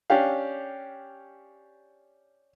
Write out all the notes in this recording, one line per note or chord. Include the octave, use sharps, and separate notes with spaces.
C#4 D4 G4 F5